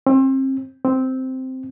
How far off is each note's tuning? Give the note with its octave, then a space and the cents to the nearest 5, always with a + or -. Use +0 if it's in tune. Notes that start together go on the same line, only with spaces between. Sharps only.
C4 +35
C4 -5